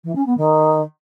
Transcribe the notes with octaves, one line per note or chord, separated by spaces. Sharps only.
E3
C#4
B3
D#3